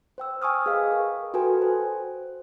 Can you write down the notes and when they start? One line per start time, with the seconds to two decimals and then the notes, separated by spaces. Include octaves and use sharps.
0.18 C5 G5 E6
0.42 G5 G#5 C#6 D#6 F6
0.66 G#4 B4 D#5 F5
0.92 A#4
1.34 F#4 A4 B4 G5 G#5
1.62 C5